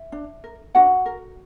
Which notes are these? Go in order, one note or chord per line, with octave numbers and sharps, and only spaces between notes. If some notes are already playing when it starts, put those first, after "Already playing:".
Already playing: E5
D4
A#4
D4 F#4 F#5
A#4